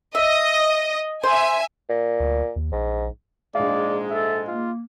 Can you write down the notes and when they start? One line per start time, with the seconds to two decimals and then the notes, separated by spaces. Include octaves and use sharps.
0.15 D#5 E5
1.23 C5 E5 G#5
1.89 A#2
2.20 D2
2.56 D#2
2.72 A#1 G#2
3.55 A#1 G#2 G#3 D5 F5
4.10 A4 E5
4.47 A#3 F4